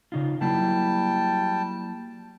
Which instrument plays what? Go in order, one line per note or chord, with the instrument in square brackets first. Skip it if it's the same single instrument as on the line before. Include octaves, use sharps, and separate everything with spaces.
[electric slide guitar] C#3 D#4 F4
[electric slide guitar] F#3 A#3 E4 [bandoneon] G3 G5 A5